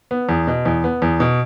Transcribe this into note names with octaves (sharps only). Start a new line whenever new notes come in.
B3
E2
B2
E2
B3
E2
B2